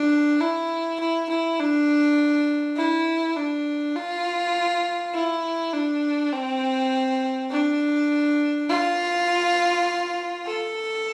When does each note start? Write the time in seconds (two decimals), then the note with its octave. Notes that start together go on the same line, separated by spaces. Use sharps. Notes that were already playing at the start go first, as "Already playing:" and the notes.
Already playing: D4
0.40 E4
1.00 E4
1.29 E4
1.59 D4
2.77 E4
3.37 D4
3.95 F4
5.14 E4
5.73 D4
6.32 C4
7.51 D4
8.69 F4
10.47 A4